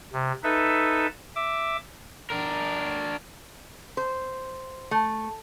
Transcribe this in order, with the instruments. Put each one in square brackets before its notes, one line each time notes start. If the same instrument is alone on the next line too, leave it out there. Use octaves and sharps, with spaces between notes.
[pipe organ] C3
D#4 A4 B4 E5
E5 D6
[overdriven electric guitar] D4 A#4
[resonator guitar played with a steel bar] C5
A3